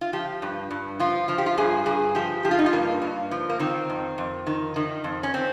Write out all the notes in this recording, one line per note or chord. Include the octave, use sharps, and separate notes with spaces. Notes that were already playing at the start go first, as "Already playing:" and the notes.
F4
F3 G4
G2
G2
F3 F4
F3 F4
G4
F4
G2 G#4
G2 G#4
F3 G4
F3 G4
F4
D#4
F4
G2 A#3
G2
F3
A#3
D#3 C4
F2
F2
D#3
D#3
F2
C#4
C4